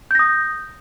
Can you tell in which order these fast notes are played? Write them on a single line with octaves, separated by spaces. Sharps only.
G6 A#6 D#6